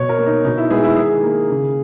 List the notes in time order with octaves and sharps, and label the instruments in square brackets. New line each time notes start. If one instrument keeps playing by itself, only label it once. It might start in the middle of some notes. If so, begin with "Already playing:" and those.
Already playing: [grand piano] B2 C#5
A#4
A#3
D#4
B2 D#4
E4
G#3 B3 G#4
E4
D#3 G#4
A#3
C#3